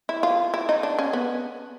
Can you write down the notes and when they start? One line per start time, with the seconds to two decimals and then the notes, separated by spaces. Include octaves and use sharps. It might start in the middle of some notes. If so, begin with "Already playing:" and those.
0.09 E4
0.23 F4
0.54 E4
0.69 D#4
0.83 D4
0.99 C#4
1.13 B3